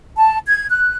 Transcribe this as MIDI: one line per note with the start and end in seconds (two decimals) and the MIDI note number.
0.17 0.38 81
0.46 0.66 92
0.70 0.97 90